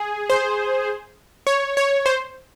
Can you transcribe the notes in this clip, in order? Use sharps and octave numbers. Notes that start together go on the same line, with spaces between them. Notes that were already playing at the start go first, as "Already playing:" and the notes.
Already playing: G#4
C5
C#5
C#5
C5